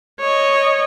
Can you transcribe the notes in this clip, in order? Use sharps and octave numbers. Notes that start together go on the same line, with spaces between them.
C#5 D#5